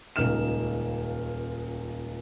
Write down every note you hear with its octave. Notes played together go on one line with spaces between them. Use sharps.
D#1 C#2 D#4 F6 E7